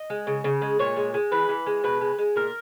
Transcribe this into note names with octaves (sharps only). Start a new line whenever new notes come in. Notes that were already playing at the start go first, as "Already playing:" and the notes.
Already playing: D#5
G#3
C#3
C#3
G#3
A#2 C#5
G#3
G#3
E3 B4
E3
G#3
B2 B4
G#3
G#3
A#2 A#4